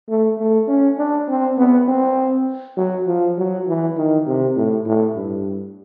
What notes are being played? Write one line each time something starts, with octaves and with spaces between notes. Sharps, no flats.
A3
A3
C#4
D4
C4
B3
C4
F#3
F3
F#3
E3
D#3
C3
A2
A2
G2